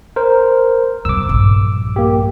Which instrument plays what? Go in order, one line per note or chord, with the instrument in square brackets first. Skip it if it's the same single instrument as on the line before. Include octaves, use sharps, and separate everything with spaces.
[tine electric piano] A#4 C5
[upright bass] F#2 B2 [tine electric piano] D6 E6
[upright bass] A#1 G2
[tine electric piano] A#3 G4